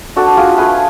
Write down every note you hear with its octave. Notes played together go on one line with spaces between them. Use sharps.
D4 F#4 A4
F4 G#4
A3 G#4 B4